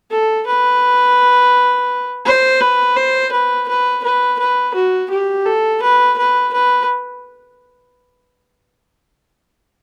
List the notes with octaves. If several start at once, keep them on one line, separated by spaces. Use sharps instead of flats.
A4
B4
C5
B4
C5
B4
B4
B4
B4
F#4
G4
A4
B4
B4
B4